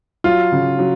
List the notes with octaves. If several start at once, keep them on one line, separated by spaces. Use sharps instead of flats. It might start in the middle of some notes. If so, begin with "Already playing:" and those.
F#3 F4
C#3
F#3